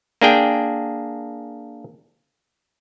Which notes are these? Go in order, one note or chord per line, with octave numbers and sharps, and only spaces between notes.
A#3 D4 G#4 G5